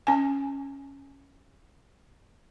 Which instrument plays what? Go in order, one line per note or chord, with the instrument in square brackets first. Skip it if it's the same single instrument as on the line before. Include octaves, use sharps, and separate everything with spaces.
[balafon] C#4 G#5